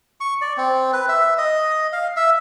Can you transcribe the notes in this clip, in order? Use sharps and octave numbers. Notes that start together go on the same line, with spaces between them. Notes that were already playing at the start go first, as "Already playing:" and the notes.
C#6
D5
C4
B4
E5
D#5
F5
E5